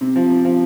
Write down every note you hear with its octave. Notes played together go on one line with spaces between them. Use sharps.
C3
F3
C3
F3